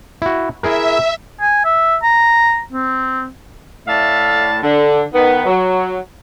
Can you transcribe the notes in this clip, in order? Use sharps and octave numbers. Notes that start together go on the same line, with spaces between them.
E4 F#4
E4 G#4 A#4 E5
G#5
E5
A#5
C4
A2 A3 D5 E5 F5 A5
D3
D#3 B3
F#3